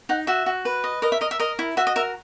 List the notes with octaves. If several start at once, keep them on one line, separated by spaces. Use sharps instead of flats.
D#4 F#5
F#4 E5
F#4
B4
D#5
A#4 D#5
E5
A#4 D#5
E5
A#4 D#5
E4
F#4 E5
D#5
A#4 E5